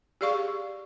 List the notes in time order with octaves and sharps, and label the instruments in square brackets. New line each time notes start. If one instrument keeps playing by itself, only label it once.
[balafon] G4 G#4 D5 F5 C#6